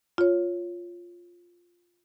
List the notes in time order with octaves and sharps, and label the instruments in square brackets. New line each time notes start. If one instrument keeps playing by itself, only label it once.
[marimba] F4 C#5